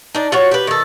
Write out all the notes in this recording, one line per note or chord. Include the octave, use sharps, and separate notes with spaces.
D4 D#4
F4 F#4 C#5
G4 B4
D#3 A4